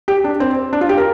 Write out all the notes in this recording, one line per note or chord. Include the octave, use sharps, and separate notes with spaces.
G4
D4
C4
D4
F4
G4
A#4